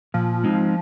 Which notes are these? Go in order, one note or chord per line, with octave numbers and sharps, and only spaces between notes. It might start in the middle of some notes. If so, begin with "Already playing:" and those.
A#2 F3
G#3 C4 D#4